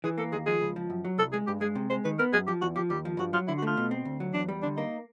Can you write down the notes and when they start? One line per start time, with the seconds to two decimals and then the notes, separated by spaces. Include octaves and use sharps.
0.04 E3 G#4
0.18 A#3 A4
0.32 D#2 G#4
0.47 F3 G#4
0.61 C#2
0.76 F3
0.90 F#2
1.05 F#3
1.18 C2 A4
1.33 G#3 G#4
1.47 G2 G4
1.61 G#3 G#4
1.75 C3
1.90 G#3 C5
2.05 D#3 B4
2.19 B3 A#4
2.33 F#2 G#4
2.47 F3 G4
2.62 E2 F#4
2.76 F3 G4
2.90 D#2 G4
3.05 F3
3.19 G2 F#4
3.33 F#3 F4
3.48 D3 E4
3.58 F#4
3.62 A3 F4
3.77 B2
3.91 C4
4.05 D2
4.20 F#3
4.34 E2 D4
4.48 G3
4.63 D3 D4
4.77 A#3 D#4